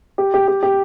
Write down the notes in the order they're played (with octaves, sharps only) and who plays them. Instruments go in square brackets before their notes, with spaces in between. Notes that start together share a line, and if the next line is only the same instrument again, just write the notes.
[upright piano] G4
G4
G4
G4